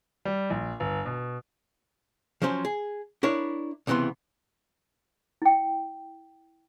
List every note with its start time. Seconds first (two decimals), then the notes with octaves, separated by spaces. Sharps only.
0.25 G3
0.50 A#1
0.80 G1
1.06 B2
2.42 F3 F#3 C#4 C5
2.65 G#4
3.23 D4 E4 A#4 C#5
3.87 C#2 C3 E3 B3 C6
5.42 E4 G5